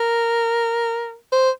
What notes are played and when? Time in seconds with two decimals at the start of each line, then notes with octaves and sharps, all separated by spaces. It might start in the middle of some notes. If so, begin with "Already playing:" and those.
Already playing: A#4
1.32 C5